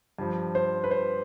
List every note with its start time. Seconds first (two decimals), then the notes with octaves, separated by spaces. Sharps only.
0.19 G2 F3
0.55 C5
0.84 B4
0.91 C5